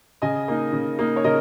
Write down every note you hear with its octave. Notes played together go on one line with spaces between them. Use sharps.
C#3 D#5 G#5
A#3 D#4
C#3
A#3 D#4
C#5
C#3 A#4 D#5